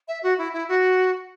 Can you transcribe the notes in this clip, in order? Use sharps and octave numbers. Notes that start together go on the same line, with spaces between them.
E5
F#4
E4
E4
F#4